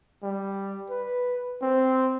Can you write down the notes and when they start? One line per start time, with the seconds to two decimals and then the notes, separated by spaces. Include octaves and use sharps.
0.23 G3
0.90 B4
1.62 C4